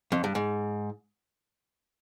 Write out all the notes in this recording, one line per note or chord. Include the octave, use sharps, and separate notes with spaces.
F2
G2
G#2